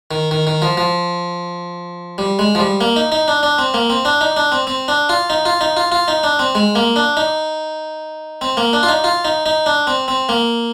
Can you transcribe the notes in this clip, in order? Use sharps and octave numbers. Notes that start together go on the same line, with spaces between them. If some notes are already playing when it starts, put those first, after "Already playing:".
D#3
D#3
D#3
F3
F3
G3
G#3
F3
G3
A#3
D#4
D#4
D4
D4
C4
A#3
C4
D4
D#4
D4
C4
C4
D4
F4
D#4
F4
D#4
F4
F4
D#4
D4
C4
G#3
A#3
D4
D#4
C4
A#3
D4
F4
D#4
F4
D#4
D#4
D4
C4
C4
A#3